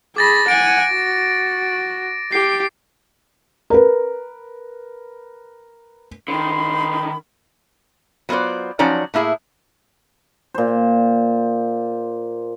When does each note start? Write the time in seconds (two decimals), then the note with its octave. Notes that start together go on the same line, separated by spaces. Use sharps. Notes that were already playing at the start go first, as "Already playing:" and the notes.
0.16 G#4 B5 D6 A6 A#6
0.48 F#5 G#5 D7
0.92 F#4
2.32 G4 C7
3.70 A#4 B4
6.28 D3 D#3 B5 C6
8.29 F#3 B3 F4 C5 D5
8.79 F3 F#3 C#4 D#4 D5
9.14 A2 A#3 E4 G#4
10.54 A#2 C5